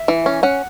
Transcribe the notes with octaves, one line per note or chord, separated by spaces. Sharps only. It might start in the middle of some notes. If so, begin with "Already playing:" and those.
Already playing: E5
E3
C#4
C#4 F#5